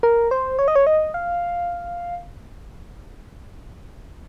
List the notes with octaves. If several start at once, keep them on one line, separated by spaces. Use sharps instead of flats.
A#4
C5
C#5
D#5
C#5
D#5
F5